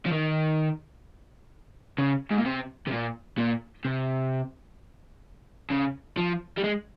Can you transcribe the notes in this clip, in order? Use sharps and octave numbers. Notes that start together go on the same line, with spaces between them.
F3
D#3
C#3
G#2
A#2
C3
C3
A#2
A#2
C3
C#3
F3
G3
G#3